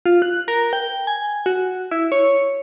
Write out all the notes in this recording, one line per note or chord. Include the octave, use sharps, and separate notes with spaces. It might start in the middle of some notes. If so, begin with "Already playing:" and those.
F4
F#6
A#4
G5
G#5
F#4
E4
C#5